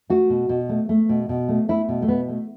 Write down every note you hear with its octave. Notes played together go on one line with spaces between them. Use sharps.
A3 F#4
B2
B2
A3
A3
B2
B2
A3
A3 E4
B2
A3
B2 B3
A3